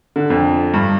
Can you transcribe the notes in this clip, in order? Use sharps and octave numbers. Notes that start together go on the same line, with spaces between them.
D3
F2
G2